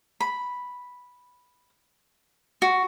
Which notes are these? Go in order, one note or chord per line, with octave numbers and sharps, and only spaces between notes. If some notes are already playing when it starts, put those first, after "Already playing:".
B5
F#4